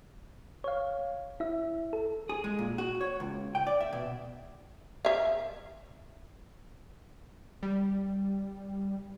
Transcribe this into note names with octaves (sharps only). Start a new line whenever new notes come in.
C#5 F5
E4 E5
A4
G#4
G#3
A#2
F#4
C#5
C#2
G5
D5
E5
B2
E5 F5
G3